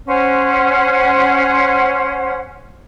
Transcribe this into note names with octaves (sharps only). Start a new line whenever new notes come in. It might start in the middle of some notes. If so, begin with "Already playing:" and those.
C#4 C5 F#5